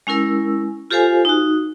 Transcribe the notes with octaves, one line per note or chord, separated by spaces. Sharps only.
G#3 C#4 E4 A#4 E6
F4 G4 A4 C5 F5 G#5
D#4 F#4